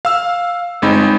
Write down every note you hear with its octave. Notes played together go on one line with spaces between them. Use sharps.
F5 E6
G1 G#3 C4 D#4 B5